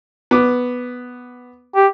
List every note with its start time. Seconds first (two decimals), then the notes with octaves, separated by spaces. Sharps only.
0.31 B3 D6
1.76 G4